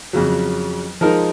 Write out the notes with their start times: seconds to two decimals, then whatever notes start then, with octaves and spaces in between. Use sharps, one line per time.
0.13 F2 C#3 F#3
1.01 F3 G#3 D#4 A#4